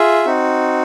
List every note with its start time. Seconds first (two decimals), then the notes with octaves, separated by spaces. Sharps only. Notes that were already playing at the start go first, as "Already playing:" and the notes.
Already playing: F4 G#4 E5
0.25 C4 D#4 F#4